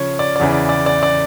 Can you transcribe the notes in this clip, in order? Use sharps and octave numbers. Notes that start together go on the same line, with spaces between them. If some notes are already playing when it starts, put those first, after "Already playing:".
Already playing: C#3 F3 C#5
D5
D5
E2 C#3 E3
D5
D5
D5
D5